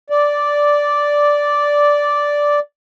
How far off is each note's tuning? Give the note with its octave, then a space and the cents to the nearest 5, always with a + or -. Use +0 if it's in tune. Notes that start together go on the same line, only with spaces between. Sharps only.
D5 -5